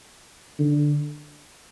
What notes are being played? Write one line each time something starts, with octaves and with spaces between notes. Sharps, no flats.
D3